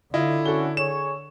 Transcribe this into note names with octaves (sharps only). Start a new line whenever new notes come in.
D3 E4 F4 D#5
C#4 F#4 A4 G7
G#4 C#5 E7